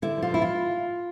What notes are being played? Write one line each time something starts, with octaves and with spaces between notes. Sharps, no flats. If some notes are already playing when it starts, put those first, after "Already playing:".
D3 E4
F3 F4
E2 E4
F4